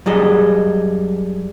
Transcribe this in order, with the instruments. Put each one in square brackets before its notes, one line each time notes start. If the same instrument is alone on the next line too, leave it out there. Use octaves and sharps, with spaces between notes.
[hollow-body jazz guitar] F#2 G3 G#4 D#5